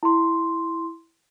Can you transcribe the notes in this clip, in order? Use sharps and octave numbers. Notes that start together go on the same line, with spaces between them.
E4 C6